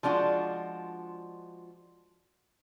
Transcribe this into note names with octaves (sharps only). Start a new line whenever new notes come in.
F3 G#3 D4 F4 F#4